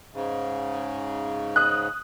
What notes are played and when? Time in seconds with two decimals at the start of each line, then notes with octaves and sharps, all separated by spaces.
0.13 G#2 C#3
1.56 D#6 F#6